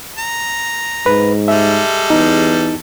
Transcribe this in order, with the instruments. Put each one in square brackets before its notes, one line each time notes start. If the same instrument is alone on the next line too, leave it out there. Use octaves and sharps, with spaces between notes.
[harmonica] A#5
[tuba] G#2 [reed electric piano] B4
[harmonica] G3 G#3 A4 [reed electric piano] E5
[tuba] E2 [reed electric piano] D#4